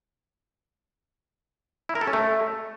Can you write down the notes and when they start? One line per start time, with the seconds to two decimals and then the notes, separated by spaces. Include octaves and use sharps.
1.89 E4
1.95 A#4
2.01 A4
2.07 C#4
2.13 A3